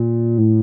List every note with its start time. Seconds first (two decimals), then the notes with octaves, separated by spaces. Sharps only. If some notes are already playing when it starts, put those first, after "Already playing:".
Already playing: A#2
0.38 A2